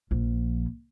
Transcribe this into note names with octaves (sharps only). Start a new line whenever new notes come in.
A#1 F3